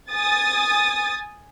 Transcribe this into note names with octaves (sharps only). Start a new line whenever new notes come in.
G#5 D#6 A6